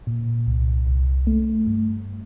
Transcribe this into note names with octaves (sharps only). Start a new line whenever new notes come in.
A#2
C2
C2
A3
G2